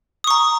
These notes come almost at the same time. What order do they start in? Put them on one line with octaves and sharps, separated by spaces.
D#6 C#6 A#5